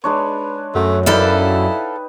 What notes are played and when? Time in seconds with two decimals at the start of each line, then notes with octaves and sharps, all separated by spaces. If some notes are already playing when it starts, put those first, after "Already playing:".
0.04 G#3 D4 B4 C#5
0.75 F#2 A3
1.06 D#4 E4 A4 B4 D5 F5 G5